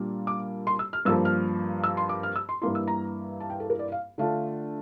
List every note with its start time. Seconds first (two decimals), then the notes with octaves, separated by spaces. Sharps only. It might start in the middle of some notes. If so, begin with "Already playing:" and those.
Already playing: A#2 G3 A#3 D4
0.27 D6
0.67 C6
0.79 E6
0.93 F6
1.05 G2 F3 A#3 E6
1.25 F6
1.84 E6
1.97 C6
2.09 D6
2.23 F6
2.36 E6
2.49 C6
2.61 G2 E3 A#3 E4 C6
2.75 E6
2.88 A#5
3.40 A5
3.50 G5
3.60 A4
3.70 A#4
3.79 D5
3.92 F5
4.18 D3 A3 D4 F4 F5